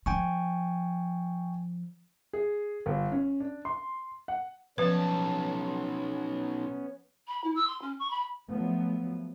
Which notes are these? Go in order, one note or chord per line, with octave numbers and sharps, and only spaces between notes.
F3 G5 G#5 C#6
G#4
G1
C#4
D4
C6
F#5
B1 F3 B3 C#4 B4 A5
B5
E4
E6
C6
C#4
C#6
B5
F3 F#3 A3 B3